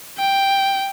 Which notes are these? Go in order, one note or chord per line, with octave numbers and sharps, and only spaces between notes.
G5